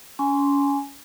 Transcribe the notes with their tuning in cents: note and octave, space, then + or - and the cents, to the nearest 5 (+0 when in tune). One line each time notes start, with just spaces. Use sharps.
C#4 +30 G#5 +0 C6 +0